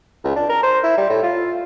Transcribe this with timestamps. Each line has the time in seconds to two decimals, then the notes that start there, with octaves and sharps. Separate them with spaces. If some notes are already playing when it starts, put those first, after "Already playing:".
0.24 C#2
0.36 D4
0.50 A#4
0.63 C5
0.84 E4
0.98 G3
1.10 A2
1.23 F4